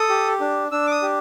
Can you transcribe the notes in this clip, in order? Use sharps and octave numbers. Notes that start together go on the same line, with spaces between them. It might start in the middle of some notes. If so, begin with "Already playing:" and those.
Already playing: A4 D#6
G4
D4
D4 E6
D6
D#6
G4